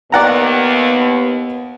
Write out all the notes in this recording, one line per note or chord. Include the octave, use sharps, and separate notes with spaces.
D#2 B3 D5 F#5 A#5